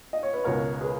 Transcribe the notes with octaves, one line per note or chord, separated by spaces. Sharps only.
D#5
C#5
B4
C#2 B2 A#4 C#5
A#4
G#4 B4